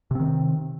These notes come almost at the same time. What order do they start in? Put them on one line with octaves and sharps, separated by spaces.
C3 C4 D#3